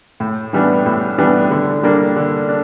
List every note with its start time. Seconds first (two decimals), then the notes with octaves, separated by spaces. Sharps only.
0.20 A2
0.53 E3 G3 B3 D4
0.86 A2
1.18 E3 G3 B3 D4
1.51 D3
1.83 G3 A#3 D4
2.16 D3
2.49 D4